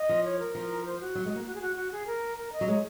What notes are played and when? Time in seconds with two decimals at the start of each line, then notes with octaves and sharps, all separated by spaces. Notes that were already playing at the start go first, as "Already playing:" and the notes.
Already playing: D#5
0.09 F3
0.24 C#5
0.39 A#4
0.55 F3
0.85 C5
1.00 F#4
1.15 F#3
1.26 G#3
1.36 A#3
1.46 F#4
1.54 G#4
1.62 F#4
1.76 F#4
1.91 G#4
2.07 A#4
2.37 A#4
2.53 D#5
2.61 F#3
2.68 G#3 C#5